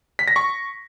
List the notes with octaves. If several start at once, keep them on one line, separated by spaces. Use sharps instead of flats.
B6
A#6
C#6